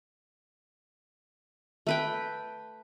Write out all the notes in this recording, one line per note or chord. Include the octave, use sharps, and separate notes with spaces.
A3 B4 G5